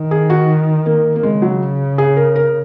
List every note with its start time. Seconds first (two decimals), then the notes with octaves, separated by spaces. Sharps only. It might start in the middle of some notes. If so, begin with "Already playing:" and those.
Already playing: D#3
0.11 G#4
0.30 F#4
0.86 A#3
1.15 A#3
1.23 C#3 G#3
1.42 F#3
1.98 G#4
2.17 A#4
2.36 A#4